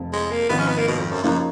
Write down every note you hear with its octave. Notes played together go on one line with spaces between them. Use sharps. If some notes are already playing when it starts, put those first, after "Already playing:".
Already playing: F1 F2 F3
G#3
A#3
G#1 G#2 F3 B3
C#4
B3
A#3
B2
F2
F#2
F#2 C#3 F3 A#3 D#4